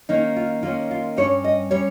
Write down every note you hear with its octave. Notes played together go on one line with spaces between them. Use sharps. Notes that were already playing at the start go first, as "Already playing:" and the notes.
D#3 A#3 C#4 D#4
F4
D#3 A#3 C#4 F4
F4
G2 G3 C#4 C#5
D#5
G3 C#4 C#5